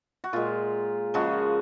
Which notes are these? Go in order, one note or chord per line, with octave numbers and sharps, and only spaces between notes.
F#4
A#2 G#3 F4
C#3 F3 G#3 F#4